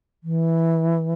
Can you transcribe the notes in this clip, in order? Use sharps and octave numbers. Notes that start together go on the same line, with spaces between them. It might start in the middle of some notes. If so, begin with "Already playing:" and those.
E3